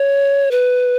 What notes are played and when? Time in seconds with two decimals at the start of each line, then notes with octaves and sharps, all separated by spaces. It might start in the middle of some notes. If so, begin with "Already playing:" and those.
Already playing: C#5
0.51 B4